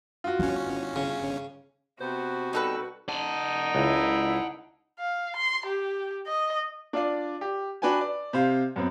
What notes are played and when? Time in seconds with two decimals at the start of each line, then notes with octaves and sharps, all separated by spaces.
0.24 F4 F#4
0.39 G1 C#4 E4
0.96 C#3
2.01 C3 B3 F#4 C5
2.53 B2 G3 C4 D#4 A4 B4
3.09 D#4 F#5 A5
3.75 C#2 E4
4.99 F5
5.37 C6
5.66 G4
6.27 D#5
6.93 D4 F4 D5
7.41 G4
7.82 D4 F#4 B4 G5 G#5
8.01 D5
8.33 C3 C5 F5
8.76 F#2 B3 C4